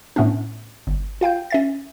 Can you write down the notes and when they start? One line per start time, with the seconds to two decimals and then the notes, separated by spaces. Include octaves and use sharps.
0.16 A2 A3 B3 C#4 D4
0.87 G1
1.21 F4 F5 G5 G6
1.50 C#4 E5 A6